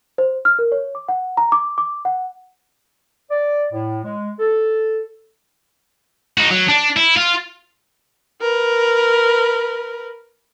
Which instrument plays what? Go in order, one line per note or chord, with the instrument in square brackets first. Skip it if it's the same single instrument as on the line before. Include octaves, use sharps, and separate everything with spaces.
[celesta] C5
F6
A#4
C#5
D6
F#5
A#5
D6
D6
F#5
[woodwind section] D5
A2
G#3
A4
[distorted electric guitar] D#4 F#4
F#3
D4
E4
F4
[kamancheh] A#4 B4